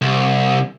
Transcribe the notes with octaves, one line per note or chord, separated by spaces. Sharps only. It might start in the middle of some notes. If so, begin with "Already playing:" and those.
C2